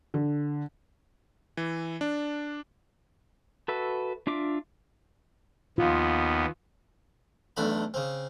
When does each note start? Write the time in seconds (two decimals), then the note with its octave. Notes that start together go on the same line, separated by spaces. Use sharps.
0.14 D3
1.57 E3
2.01 D4
3.68 F#4 A4 B4 E5
4.27 D4 F4 E5 D6
5.78 D#2 B3 F4
7.57 B1 E2 A3 D4 B5
7.94 C#3 C4